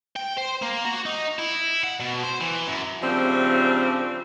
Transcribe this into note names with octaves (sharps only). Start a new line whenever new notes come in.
G5
C5
A#3
F#4
D#4
E4
F#5
B2
C5
E3
F#2
C#3 F3 G3 A3 C4 D4